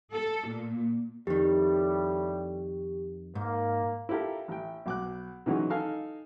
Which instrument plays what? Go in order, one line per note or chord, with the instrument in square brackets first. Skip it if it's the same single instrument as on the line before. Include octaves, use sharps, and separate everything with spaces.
[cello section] A4
A#2
[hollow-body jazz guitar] F2 D#3 [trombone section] A2 G3 [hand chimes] G4
[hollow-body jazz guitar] G#2 [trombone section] A#3
[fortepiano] E4 F4 G4 A4 A#4
A1 G5
B1 D6 F#6
D#3 E3 F#3 G#3 C#4 D#4
D#4 A4 F5 G#5